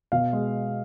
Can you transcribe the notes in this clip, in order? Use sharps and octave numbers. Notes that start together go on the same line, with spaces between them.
B2 F5
G#3